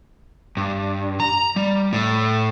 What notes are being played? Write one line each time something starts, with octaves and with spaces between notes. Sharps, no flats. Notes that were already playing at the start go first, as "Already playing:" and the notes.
G2
A#5
G3
A2